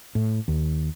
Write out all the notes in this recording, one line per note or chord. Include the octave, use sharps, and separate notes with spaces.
A2
D#2